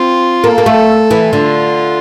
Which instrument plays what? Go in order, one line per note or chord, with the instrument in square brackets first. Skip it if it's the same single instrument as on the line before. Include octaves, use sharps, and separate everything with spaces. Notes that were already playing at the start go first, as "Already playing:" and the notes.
Already playing: [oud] C4 [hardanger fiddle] F4
[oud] A#3 [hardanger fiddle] A4
[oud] A#3
A3
E3
[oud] D3 [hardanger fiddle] F4